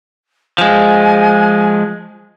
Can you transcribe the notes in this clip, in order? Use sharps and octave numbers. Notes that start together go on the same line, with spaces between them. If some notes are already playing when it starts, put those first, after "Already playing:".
F3 G#3 G#5